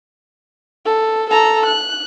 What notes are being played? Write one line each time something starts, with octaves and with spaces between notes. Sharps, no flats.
A4
A4 A#5
F#6